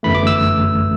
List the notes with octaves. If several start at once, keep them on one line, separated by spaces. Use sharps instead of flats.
G1 F#2 E3 A3 B5
D6
E6